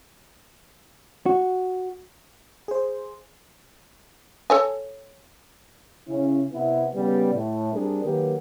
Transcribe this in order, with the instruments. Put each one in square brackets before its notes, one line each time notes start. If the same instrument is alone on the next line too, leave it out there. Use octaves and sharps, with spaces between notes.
[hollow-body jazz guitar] F#4
[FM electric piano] G#4 C5
[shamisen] A4 C#5 G#5
[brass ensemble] C#3 C#4 E4
C3 B3 E4
C#3 G3 B3
A2
G3 C4 D4 G#4 A#4
D#3 F#3 A#3 G4 A#4 B4